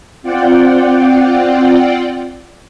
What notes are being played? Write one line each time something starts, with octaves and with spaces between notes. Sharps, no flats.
C4 F4 D5 F#5 G5